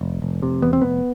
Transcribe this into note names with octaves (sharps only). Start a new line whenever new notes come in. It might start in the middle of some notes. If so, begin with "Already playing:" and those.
F1
F1
C3
E2 B3
C4
F1 B3